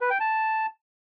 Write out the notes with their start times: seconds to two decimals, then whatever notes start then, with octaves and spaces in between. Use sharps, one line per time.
0.01 B4
0.10 G5
0.20 A5